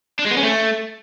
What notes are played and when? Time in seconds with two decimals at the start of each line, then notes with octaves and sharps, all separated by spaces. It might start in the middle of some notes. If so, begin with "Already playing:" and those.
0.19 D4
0.25 G#3
0.31 B3
0.37 C#4
0.43 A3